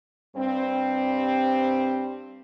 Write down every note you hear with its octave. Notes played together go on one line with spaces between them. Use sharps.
G2 G3 C4